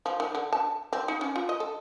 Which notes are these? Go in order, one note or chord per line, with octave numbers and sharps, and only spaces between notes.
F3
D#3
D3
A5
C4
D#4
C#4
F4
D#5
A4